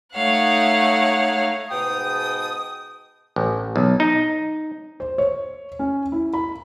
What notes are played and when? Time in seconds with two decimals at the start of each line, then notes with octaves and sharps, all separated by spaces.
0.15 A3 D#4 C#5 F5 F#5
1.71 G#2 B2 G5 D#6
3.36 A1
3.76 B1
4.00 D#4
5.00 C5
5.18 C#5
5.79 C#4
6.12 E4
6.34 B5